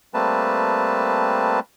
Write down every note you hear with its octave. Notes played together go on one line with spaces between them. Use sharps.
G3 A3 A#3 C4 B4 A5